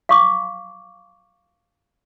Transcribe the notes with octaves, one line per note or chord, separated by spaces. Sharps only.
F5 C#6 D6